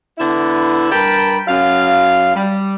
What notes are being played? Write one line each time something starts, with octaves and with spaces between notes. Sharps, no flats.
D3 B3 E4
G2 A#4 G5 A5 B5
F#2 F#3 F5
G3